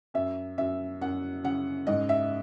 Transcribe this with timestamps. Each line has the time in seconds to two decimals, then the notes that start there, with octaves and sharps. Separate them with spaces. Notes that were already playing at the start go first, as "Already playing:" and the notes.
0.14 F#2 E5
0.58 F#2 E5
1.01 F#2 F#5
1.44 C#3 F#5
1.87 G#2 D#5
2.09 E5